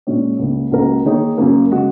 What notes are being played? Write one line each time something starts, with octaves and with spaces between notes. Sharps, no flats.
A#2 G#3 C#4
C#2 C#3 A#3
C#2 C#3 A#3 F#4 A#4
D#3 A#3 D#4 G#4 C#5
F#2 C#3 A#3
C#3 G#3 F#4